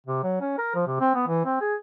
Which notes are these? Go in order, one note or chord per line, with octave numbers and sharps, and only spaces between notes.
C3
F#3
C#4
A#4
F3
C3
C4
B3
E3
C4
G#4